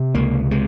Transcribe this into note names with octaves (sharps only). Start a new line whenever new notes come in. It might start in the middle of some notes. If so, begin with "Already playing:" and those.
Already playing: C3
C#2 A#3
C3 G#3